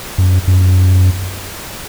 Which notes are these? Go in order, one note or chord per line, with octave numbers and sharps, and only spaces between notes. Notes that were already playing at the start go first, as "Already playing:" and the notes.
F#2
F#2